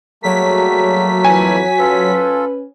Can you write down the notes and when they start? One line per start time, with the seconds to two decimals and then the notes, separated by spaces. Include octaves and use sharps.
0.23 F#3 G3 A3 A#3 G#4 A4 B6
1.25 F2 E3 G#5
1.79 C#4 F4 A4 B4